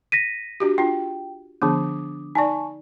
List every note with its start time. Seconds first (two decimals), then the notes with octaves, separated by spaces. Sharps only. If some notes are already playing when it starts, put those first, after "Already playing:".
0.12 A#6 B6 D#7
0.60 D4 F#4 G4
0.78 D4 F4 G5
1.62 D3 F3 B3 D4 D6 D#6
2.35 D#4 D5 G#5 A5 C#6